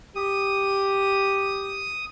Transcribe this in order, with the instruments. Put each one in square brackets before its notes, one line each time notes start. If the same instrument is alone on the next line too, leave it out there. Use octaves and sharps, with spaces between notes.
[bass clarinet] G4 [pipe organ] D#6